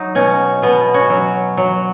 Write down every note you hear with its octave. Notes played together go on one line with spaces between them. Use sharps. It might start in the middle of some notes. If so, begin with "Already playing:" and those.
Already playing: F#3 D#4
B2 C#4
B2 B3
C#4 F#4
F#3
F#3